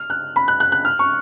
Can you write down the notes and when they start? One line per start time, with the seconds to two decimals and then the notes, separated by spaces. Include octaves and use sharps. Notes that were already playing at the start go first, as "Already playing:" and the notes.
Already playing: F6
0.10 F#6
0.36 B5
0.48 F#6
0.60 F#6
0.72 F#6
0.85 F6
0.99 C#6